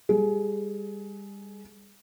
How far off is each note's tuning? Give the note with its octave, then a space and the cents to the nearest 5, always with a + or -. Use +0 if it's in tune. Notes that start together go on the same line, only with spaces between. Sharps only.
G3 +35 G#4 +30